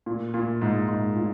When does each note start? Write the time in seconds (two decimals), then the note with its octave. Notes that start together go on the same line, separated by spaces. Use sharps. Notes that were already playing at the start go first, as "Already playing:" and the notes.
0.06 A#2
0.34 A#2
0.62 G#2
0.88 G#2
1.16 A#2